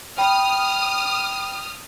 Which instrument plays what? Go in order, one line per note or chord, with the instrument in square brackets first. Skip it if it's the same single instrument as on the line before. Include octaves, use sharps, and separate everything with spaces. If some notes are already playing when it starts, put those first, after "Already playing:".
[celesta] G5 B5 [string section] D#6 F6